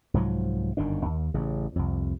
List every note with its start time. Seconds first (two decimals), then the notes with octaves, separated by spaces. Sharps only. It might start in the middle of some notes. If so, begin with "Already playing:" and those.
0.14 C2 G#2 F3 F#3
0.77 G1 F#2 D#3 D4
1.05 D#2
1.34 A1 C#3
1.76 C2 F2